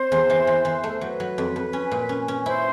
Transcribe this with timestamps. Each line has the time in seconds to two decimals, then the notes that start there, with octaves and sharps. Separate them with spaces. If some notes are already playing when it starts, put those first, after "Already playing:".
Already playing: C4 C5
0.12 E2
0.30 E3
0.47 E3
0.65 E3
0.84 A3
1.01 F#3 B4
1.20 F#3
1.38 F2
1.56 F2
1.73 C#4
1.91 A#2
2.09 C#4
2.28 C#4
2.46 E4 C5